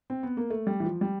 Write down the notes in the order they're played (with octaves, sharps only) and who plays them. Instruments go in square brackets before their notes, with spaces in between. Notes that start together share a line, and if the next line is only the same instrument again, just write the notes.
[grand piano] C4
B3
A#3
A3
G3
E3
F3
G3